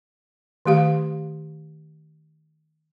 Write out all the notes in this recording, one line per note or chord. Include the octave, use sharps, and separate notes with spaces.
D#3 A3 G4 F5